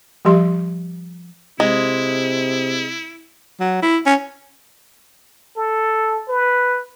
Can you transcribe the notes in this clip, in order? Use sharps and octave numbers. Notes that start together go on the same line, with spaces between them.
F3 G3 G4 C6
C3 G#3 E4
F#3
E4
C#4
A4
B4